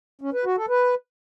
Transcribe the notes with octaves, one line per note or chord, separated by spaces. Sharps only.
C#4
B4
F#4
A4
B4